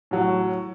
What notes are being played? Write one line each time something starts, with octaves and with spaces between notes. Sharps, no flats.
A2 F#3